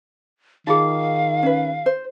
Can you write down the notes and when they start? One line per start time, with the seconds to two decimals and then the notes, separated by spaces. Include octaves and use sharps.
0.67 D#3 D#4 F4 G#4 F5
1.43 C#4 B4
1.86 C5